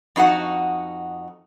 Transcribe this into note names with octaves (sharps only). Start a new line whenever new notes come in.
F2 D#4 F#4 F#5